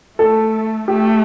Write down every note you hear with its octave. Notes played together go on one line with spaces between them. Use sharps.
A3 A4
A3 G4